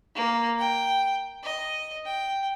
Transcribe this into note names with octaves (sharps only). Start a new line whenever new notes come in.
A#3
G5
D#5
G5